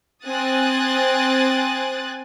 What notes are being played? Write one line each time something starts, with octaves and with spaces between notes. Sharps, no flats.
C4 G#5 D#6 F#6 A6